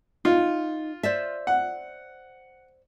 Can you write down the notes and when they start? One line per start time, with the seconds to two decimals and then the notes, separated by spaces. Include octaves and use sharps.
0.25 D#4 F4
1.03 C5 D5 E5
1.47 F#5